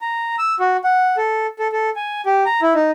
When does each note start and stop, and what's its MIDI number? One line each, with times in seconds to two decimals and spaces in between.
0.02 0.36 82
0.38 0.55 88
0.60 0.77 66
0.84 1.16 78
1.17 1.47 69
1.59 1.68 69
1.72 1.90 69
1.96 2.21 80
2.26 2.44 67
2.46 2.60 82
2.62 2.74 64
2.75 2.91 63